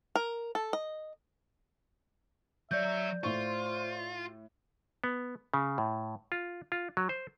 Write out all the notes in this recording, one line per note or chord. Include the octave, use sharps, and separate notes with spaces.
A#4
A4
D#5
F#3 C#5 D5 E5 G6
A2 F4 C5 C#6
B3
C#3
A2
F4
F4
F#3
C5